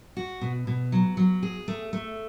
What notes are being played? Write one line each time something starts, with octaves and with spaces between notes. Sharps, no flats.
F#4
B2
B2
F#3
F#3
G#4
A3
A3